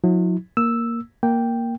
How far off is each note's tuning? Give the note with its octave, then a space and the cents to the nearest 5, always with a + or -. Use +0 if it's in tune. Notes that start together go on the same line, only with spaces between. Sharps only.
F#3 -40 E4 -35
A#3 +0 E6 +0
A#3 +0 G5 +0